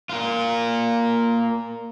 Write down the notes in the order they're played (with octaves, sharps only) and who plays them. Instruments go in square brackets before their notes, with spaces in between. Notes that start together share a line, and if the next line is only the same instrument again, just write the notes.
[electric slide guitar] A#3 F4